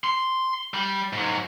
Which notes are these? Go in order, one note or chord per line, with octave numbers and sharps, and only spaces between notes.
C6
G3
G#2 F#3